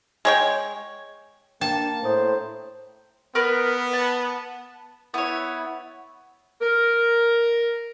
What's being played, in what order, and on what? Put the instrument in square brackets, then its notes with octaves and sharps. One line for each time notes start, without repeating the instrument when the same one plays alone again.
[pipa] G#3 C#5 G5
[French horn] A#3 [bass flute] D4 [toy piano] G5 [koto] A5
[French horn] A2 [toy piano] E4 A#5 D#6 [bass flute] C5
[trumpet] B3 [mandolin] A#4 B4 F6
[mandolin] A5
[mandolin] B3 C#5 [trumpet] E4
[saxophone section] A#4